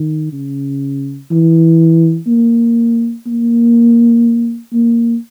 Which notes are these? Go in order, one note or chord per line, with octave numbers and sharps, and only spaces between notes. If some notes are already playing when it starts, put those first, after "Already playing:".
Already playing: D#3
C#3
E3
A#3
A#3
A#3